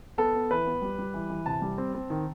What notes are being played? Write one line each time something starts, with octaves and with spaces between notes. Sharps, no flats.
B3 A4
B3
E3 B4
B3
G3
G3
E3
E3
C3 A5
G3
C4
C4
D#3